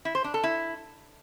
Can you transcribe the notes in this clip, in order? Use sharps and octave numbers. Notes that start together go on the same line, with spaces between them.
E4
C5
D4
A4
E4